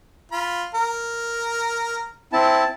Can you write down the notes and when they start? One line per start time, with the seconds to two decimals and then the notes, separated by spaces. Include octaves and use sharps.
0.32 F4 B5
0.74 A#4
2.33 C4 E4 A5